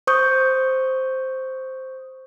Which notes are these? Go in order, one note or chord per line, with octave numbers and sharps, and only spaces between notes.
C5 C#6 D#6 G6